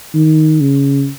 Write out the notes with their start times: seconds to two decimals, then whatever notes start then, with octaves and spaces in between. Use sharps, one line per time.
0.14 D#3
0.61 C#3